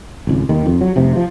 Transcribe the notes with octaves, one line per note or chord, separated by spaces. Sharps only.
G#1 C#2
D#2 D#3
F2
F#3
F1 C3
F3